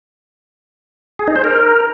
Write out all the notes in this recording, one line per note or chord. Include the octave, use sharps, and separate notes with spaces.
G#4
D#4
C5
A#4